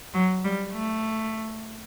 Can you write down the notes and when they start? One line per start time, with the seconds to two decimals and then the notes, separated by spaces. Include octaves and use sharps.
0.14 F#3
0.45 G3
0.73 A3